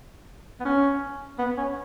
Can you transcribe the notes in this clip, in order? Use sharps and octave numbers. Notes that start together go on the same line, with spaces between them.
B3
C#4
B3
C#4